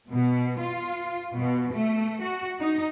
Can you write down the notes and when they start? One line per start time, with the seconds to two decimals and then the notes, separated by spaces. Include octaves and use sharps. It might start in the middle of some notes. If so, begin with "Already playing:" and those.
0.10 B2
0.60 F4
1.37 B2
1.75 A3
2.23 F#4
2.60 D#4